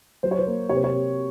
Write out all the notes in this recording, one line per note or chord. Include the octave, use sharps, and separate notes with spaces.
F#3 C5
C#5
C5
A#3
C3 C#5
C5
C#5
C3